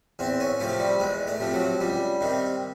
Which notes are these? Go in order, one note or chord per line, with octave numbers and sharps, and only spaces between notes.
E2 C4
C#4
C3 F3 A3
G3
E2 G#3
A3
C3 F3
F#3
C#2 G3
C3 D#3